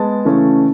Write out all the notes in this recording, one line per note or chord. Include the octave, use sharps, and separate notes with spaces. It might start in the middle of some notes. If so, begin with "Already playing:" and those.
Already playing: G#3 B3 A5
C#3 E3 A3 C#4